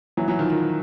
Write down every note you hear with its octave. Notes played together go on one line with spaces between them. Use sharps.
E3 F#3
E3 F#3
D#3 F3
D#3 F3